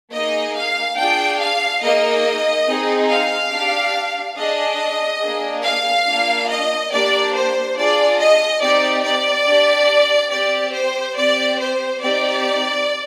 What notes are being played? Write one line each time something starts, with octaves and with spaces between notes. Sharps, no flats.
A#3 D#4 G#4 D#5
F5
D4 F4 G#4 G5
F5
A#3 D#4 G#4 D#5
C4 D#4 G#4
F5
D4 G4
D4 G#4 D#5
A#3 D4 G#4
F5
A#3 D4 F4
D#5
A#3 D4 G4 D5
C5
D4 F4 G#4 D5
D#5
C4 D#4 G4 D5
D5
D4 G4
C4 G4 D5
C5
C4 G4 D5
C5
C4 D#4 G4 D5